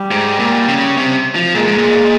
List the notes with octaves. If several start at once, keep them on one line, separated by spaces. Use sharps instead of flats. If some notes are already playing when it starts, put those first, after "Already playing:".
Already playing: G3
G#2
A#2
C#3
C3
F3
A#2 G#3
G#2
A#2